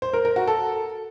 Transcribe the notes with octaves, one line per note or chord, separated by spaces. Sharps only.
C5
A#4
A#4
F#4
A4